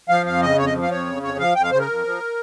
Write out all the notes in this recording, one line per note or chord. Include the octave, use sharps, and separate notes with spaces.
F3 F5
F2 F5
C#3 D#5
F2 C#5
D#5
F3
F5
F2 C#5
C#3
F2 C#5
F3 F5
F2 G5
F5
C#3 C5
A#4
F2
F3